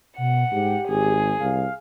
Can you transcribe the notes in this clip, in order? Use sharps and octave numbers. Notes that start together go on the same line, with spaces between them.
B2 F#5
G#2 G4
G#1 G#4
C2 F5